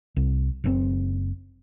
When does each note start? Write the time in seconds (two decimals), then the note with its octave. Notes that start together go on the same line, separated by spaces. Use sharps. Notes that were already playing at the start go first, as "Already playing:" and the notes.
0.16 C2
0.64 F#1 B2 C4